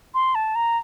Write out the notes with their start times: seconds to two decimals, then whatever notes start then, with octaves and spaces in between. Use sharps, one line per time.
0.14 C6
0.35 A5
0.55 A#5